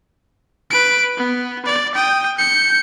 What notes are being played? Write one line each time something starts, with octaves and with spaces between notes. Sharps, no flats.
B4 D7
B3
D5
G5 D#6
G6 C#7